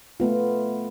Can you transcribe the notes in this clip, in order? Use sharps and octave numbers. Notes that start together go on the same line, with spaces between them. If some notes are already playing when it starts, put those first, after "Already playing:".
A3 B3 F4